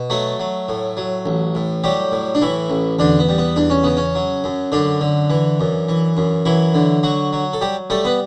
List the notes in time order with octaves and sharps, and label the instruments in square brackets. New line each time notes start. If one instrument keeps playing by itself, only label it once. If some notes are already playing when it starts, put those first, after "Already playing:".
Already playing: [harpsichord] B2
F#3 A3 A4
F#3
A2
F#3
A1
A2
F#3 G3 G4
A2
D4
A2 E3 E4
A1
E2 D3 D4
B3
G3
B3
E2 D4
C#4
C#3 B3
C#4
F#3
F#2
F#2 D3 D4
D3
E3
F#2
E3
F#2
E3 F#3 E4
D3
F#3 F#4
F#3
A4
G3 G4
G3 A3 A4
B3 B4